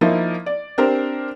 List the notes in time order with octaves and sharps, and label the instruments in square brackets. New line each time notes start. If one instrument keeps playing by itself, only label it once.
[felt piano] F3 A#3 D#4 E4
D5
C4 D4 G4 A#4 C5